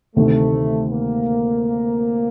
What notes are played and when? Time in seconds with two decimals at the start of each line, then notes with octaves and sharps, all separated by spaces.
0.16 D2 C3 D#3 A3
0.90 A#3